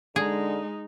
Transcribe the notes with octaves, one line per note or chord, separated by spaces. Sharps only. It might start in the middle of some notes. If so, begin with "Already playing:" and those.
D3 G#3 D#4 G#4